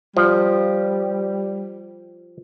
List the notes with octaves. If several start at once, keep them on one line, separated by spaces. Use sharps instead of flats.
F3 G3